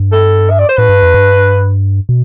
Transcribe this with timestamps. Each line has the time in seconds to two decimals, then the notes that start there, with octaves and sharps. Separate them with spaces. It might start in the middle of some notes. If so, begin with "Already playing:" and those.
Already playing: G2
0.12 A4
0.50 E5
0.59 D5
0.69 C5
0.77 A2 B4
0.89 G2
1.02 F2
1.14 G2
2.09 B2